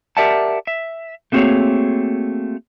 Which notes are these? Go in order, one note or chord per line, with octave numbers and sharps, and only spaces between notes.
G4 A#4 D5 E5 F#5 A5
E5
A3 A#3 C4 F#4 G#4 C#5